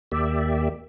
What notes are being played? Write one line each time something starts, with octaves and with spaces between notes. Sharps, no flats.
D#2 A#3 G4 D5 E5